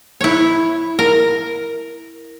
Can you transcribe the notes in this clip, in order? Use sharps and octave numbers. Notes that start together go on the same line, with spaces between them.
E4 C#5
A#4